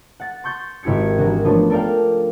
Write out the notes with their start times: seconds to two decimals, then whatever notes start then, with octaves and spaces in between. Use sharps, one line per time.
0.20 F#5 A6
0.44 C6 C#6 G6 A6
0.83 G#1 E4 G4 G#6 C#7
1.17 E3 D4 F#4 A#4
1.44 F3 A3 B3 C#4 D4
1.70 A4 A#4 D5 F5 G5